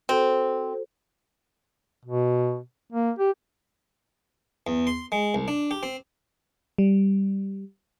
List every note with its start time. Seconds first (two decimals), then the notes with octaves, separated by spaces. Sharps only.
0.09 C4 F#4 A4 C5
2.05 B2
2.92 A#3
3.19 G4
4.67 E2
4.87 C6
5.12 G#3
5.34 C2
5.48 D4
5.71 G4
5.83 C4
6.78 G3